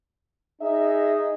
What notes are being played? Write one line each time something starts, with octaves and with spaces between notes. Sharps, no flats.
D#4 G#4 D#5 E5